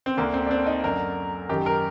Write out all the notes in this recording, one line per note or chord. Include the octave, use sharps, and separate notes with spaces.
C4
D2 D3 A#3
C4
D4
C4
D#4
F#2 D3 A#4
F#2 D#3 G4
A#4